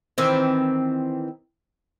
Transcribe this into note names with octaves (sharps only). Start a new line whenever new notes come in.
D#3 E3 C4